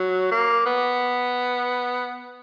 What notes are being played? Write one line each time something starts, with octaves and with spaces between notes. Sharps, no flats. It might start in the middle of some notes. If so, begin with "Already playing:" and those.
Already playing: F#3
A#3
B3